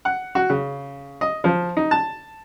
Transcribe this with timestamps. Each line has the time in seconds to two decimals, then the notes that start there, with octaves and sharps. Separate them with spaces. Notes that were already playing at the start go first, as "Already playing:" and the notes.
0.05 F#5
0.35 F#4
0.50 C#3
1.21 D#5
1.44 F3
1.77 D#4
1.91 A5